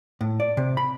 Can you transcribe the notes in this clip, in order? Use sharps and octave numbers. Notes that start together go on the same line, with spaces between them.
A2
D5
C3
B5